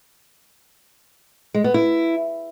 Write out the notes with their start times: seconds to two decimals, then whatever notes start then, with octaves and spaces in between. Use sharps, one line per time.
1.54 G#3
1.64 B3
1.74 E4